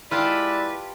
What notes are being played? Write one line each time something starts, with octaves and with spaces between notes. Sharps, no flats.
G#3 E4 F4 G4 B4 D5 A5